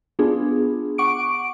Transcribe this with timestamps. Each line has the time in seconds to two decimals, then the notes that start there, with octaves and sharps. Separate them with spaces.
0.19 B3 D4 F4 G#4
0.98 F#5 C#6 D6 D7